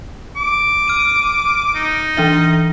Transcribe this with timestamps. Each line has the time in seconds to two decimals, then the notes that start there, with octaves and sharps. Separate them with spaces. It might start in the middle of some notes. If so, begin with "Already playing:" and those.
0.36 D6
0.88 F6 D#7
1.75 D#4
2.17 E3 D4 E5